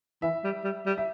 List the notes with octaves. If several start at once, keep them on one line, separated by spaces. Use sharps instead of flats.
E3 E5
G3
G3
G3
E5